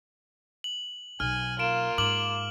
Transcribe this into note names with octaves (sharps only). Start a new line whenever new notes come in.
F#7
B1 G#5 F6
A#3 F4 D7 E7
G#2 D6 F6 F#7